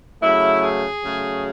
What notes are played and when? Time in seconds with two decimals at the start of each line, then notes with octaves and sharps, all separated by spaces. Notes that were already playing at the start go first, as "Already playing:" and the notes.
0.22 C#3 F#3 A3 E4
0.62 G#4
1.02 C#3 F#3 A3